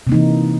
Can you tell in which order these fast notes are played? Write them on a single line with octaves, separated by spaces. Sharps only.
C3 A#3 D#4 E3